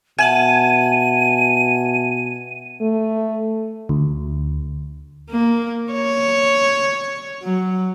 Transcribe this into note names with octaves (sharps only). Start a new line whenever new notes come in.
B2 E5 F#5 G#5 A5 D#7
A3
D2
A#3
C#5
F#3